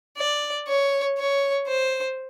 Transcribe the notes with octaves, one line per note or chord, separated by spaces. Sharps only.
D5
C#5
C#5
C5